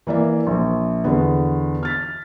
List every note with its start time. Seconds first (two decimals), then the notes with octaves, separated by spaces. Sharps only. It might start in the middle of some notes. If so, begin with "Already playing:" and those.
0.07 E3 A#3 D5 E5
0.47 A#1
1.04 E2 D3 B3
1.83 F6 A6 B6